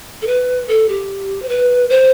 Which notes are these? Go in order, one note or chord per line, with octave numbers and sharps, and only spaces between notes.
A4
B4
A4
G4
C5
B4
C5